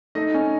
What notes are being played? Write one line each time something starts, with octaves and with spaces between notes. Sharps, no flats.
A3 D#4 D#5
C#4